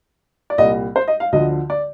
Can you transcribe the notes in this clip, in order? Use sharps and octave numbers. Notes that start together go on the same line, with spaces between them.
D5
C2 A#2 G3 D#5
C5
D#5
F5
D2 D3 F3 D#5
D5